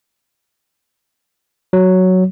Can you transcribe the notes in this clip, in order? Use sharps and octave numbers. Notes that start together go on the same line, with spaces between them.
F#3